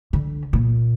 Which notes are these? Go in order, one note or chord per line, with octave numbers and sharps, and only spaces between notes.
D3
A#2